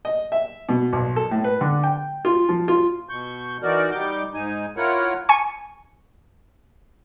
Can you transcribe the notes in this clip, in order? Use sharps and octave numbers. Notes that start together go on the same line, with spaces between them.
D#5
E5
B2
B1
A4
A2
B4
D3
G5
F4
F3
F4
B2 C#6 G6
E3 D#4 F#4 A#4 D5
G3 D#4 D6 G6
G#2 D#4 G#5
E4 F4 A#4 C#5 F#5
G#5 C#6